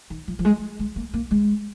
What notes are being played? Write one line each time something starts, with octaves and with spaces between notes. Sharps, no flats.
D#3
F3
F3
G#3
G#3
A#3
A#3
G#3